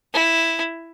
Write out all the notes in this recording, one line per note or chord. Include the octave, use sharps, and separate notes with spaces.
E4